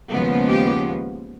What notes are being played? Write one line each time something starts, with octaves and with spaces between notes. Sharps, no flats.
D#2 C#3 F3 G#3 B3
G4